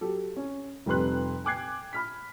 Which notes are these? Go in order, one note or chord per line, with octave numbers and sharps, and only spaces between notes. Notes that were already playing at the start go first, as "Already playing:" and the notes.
F#3 G4 A4
C#4
F1 F2 G3 B4 C6 F#6
G5 G#5 D6 F#6 G#6 C7
B5 F6 B6